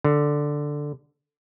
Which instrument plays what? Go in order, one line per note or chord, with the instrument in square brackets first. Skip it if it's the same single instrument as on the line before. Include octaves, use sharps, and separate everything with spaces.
[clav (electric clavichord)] D3